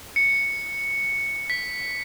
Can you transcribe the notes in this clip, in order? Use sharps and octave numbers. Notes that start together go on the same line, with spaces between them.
C#7
B6